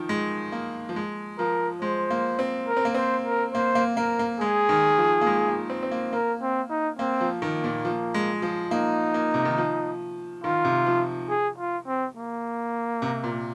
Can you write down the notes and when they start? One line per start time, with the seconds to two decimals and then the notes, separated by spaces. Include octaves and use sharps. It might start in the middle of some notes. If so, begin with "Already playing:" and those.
Already playing: D#3 F3
0.09 G#3
0.52 A#3
0.89 F3
0.96 G#3
1.39 F3 A#4
1.82 G#3 C5
2.10 A#3
2.39 C4
2.68 A#4
2.77 C4
2.85 A#3
2.95 C4 C5
3.26 A#4
3.54 A#3 C5
3.75 A#3
3.97 A#3 A#4
4.19 A#3
4.40 G#3 G#4
4.69 D#3
4.98 F3
5.21 A#3
5.27 G#3
5.48 A#3
5.70 C4
5.83 C4
5.91 A#3
6.13 A#3 A#4
6.42 C4
6.70 D#4
6.99 A#3 C4
7.21 F3
7.42 D#3 A#3
7.64 A#2
7.85 F3
8.14 G#3
8.42 F3
8.71 A#3 D#4
9.14 A#3
9.34 C3
9.45 D#3
9.58 F3
10.44 D#3 F4
10.65 C3
10.86 F3
11.29 G#4
11.58 F4
11.87 C4
12.17 A#3
13.02 C3
13.24 A#2